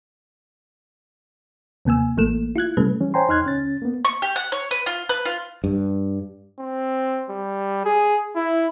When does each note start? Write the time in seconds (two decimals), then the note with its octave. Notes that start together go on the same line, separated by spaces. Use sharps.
1.85 D#2 C3 A#3 G#5 E6
2.17 A1 E3 A3 A#3 A4 E7
2.56 E4 F4 F#6 G#6
2.77 C3 G3 A3 C#4 A4 B4
3.00 E3 G3 C#4
3.14 C5 C#5 G5 G#5 A#5 C6
3.28 E2 D#4 C6 F6 F#6 G#6
3.44 C#2 C#4 A6
3.82 A#3 B3
4.05 C#6
4.22 G4
4.36 F#5
4.52 C#5
4.71 B4
4.86 F4
5.09 B4
5.25 F4
5.64 G2
6.59 C4
7.30 G3
7.85 G#4
8.36 E4